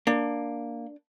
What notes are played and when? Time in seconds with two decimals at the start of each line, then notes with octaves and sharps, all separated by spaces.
0.07 A#3 D4